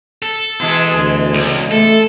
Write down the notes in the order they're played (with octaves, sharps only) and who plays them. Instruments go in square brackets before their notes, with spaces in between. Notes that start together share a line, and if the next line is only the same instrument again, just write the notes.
[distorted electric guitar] A4
[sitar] B2 E3 G#3
[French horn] D2
[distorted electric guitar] C#2
[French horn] A3 [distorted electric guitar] A4